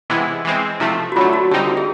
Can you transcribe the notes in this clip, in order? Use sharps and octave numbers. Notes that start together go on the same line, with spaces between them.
C3 E3 G#3 B3 E4
E3 G#3 C4
C3 F3 A3 E4
F#4
D3 F#3 A3 F4
F#4
D3 G3 C4 D#4 G4
G#4